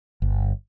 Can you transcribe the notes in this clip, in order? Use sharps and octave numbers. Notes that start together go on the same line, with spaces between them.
G1